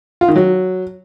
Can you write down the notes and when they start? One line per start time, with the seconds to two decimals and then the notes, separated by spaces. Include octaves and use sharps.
0.21 F4
0.28 D#3
0.36 F#3